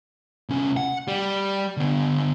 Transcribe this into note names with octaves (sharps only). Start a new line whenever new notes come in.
C2 C#4
F#5
G3
D3 B3